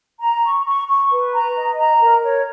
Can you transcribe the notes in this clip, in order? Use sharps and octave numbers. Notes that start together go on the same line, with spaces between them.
A#5
C#6
C#6
C#6
B4
A#5
D#5
A#5
A#4
C#5